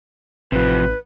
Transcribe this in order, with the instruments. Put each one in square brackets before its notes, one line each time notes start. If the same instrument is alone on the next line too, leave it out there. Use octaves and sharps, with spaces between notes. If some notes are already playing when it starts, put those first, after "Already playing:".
[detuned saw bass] A1 [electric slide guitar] C3 F3 [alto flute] B4